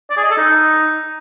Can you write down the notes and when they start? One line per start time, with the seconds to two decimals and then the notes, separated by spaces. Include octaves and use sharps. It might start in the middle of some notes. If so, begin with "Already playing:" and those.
0.10 D5
0.17 G#4
0.24 D#5
0.30 A4
0.37 D#4